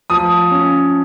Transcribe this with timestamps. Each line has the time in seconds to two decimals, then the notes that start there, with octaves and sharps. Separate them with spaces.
0.10 F3 D#6
0.51 C#4